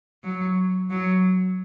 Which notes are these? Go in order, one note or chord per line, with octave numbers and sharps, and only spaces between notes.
F#3
F#3